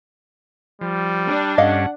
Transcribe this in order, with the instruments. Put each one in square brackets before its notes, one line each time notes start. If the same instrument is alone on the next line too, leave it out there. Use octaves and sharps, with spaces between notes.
[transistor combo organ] F3 [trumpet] G3
[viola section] D4
[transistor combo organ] G2 C#4 [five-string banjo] A4 D#5 F5 [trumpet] F#5